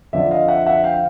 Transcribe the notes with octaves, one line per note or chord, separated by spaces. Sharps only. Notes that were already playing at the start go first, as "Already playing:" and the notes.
F2 D3 F3 D5 E5
D#5 F5
E5 F#5
E5 F#5
F5 G5
F5